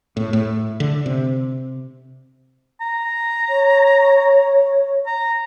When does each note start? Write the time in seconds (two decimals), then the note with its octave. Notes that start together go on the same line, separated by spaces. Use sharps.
0.17 A2
0.33 A2
0.80 D3
1.06 C3
2.81 A#5
3.49 C#5
5.07 A#5